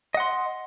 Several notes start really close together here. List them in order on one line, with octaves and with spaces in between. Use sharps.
D#5 F#5 C6